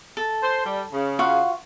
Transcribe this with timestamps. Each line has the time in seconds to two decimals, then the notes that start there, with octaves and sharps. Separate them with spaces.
0.17 A4
0.43 C5
0.65 G3
0.93 C#3
1.19 F4 F#4 F5